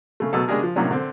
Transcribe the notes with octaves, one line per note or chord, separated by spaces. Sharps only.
C#3 A3
B2 F#3 A3 A4
C#3 G#3 D4 G4 G#4 A#4
F3
A2 C3 F#3 A#3 C#4 D4
D3 C4